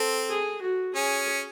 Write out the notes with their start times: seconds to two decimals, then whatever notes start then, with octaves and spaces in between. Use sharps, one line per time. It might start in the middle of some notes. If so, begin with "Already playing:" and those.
Already playing: C4 A4
0.29 G#4
0.62 F#4
0.94 C#4 G#4